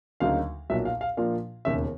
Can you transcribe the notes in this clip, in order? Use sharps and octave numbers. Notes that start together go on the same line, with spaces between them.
D2 C#3 F#3 A#3 D#4 F5
B1 A#2 F#3 E5
F5
F5
A#2 F3 A#3 D4 F4 F5
E1 D#2 C#3 E5